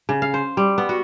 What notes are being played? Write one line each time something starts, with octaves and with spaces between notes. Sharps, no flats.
C#3
F5
C5
G3
B3
F#4